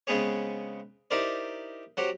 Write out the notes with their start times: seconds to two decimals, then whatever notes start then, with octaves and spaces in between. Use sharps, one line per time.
0.07 C#3 G#3 B3 C4 G#4 C#5
1.11 D#4 E4 G4 A#4 C5 D5
1.97 F#3 C4 F#4 G4